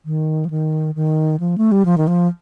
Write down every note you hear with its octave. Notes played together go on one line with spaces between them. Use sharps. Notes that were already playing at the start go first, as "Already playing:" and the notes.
D#3
F3
D#3
D#3
F3
A3
G3
F3
D#3
F3